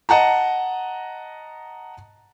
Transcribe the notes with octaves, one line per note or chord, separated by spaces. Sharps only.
D#5 F#5 A5 A#5